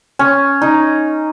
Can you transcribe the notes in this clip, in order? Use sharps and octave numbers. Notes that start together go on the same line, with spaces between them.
C#4
D#4